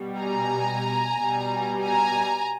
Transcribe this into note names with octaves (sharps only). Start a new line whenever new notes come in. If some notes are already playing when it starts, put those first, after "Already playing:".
Already playing: B2 G3
G#5 A#5
B2 G3
G#5 A#5